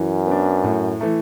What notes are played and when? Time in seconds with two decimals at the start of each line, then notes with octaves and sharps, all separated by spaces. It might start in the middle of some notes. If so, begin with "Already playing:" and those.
Already playing: F#2 E3
0.27 B3 D4
0.64 A2
1.01 E3 A3